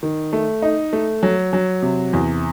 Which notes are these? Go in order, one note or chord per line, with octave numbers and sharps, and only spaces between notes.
D#3
A3
D#4
A3
F#3
F#3
C3
E2